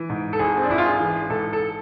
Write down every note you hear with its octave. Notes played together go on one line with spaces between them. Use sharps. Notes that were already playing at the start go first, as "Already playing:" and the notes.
Already playing: E3
G#2
A4
G#1 G#4
C4
D4
G#1 E4
F4
G#4
E3
G#2 A4
A4